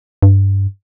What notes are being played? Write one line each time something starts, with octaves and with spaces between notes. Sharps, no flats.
G2